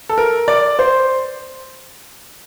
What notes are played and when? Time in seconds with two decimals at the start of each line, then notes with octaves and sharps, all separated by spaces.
0.09 A4
0.18 A#4
0.48 D5
0.79 C5